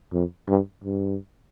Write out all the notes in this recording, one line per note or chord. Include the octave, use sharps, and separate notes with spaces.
F2
G2
G2